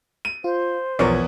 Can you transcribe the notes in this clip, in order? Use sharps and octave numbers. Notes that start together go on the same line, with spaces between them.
D#7
F4 C5
B1 E2 F3 B3 A#4 C#5 D5 G#6